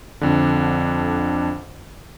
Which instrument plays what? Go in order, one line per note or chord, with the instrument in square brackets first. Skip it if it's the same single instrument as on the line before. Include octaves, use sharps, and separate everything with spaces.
[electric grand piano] F2 D3